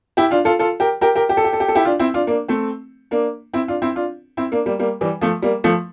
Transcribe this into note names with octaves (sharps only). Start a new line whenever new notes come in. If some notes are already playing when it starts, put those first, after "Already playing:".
E4 G4
D4 F4
F4 A4
F4 A4
G4 A#4
G4 A#4
G4 A#4
G4
A4
G4
A4
G4
A4
E4 G4
D4 F4
C4 E4
D4 F4
A#3 D4
A3 C4
A#3 D4
C4 E4
D4 F4
C4 E4
D4 F4
C4 E4
A#3 D4
G3 A#3
G3 A#3
E3 G3
F3 A3
G3 A#3
F3 A3